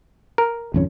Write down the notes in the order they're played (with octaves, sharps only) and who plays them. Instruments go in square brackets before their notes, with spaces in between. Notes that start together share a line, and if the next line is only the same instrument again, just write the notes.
[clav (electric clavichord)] A#4
[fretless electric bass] G#1 F2 C#4